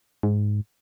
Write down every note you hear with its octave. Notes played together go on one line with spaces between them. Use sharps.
G#2